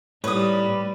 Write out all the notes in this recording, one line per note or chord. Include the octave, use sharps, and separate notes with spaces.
A2 G3 D#4 B4 C#5 D#6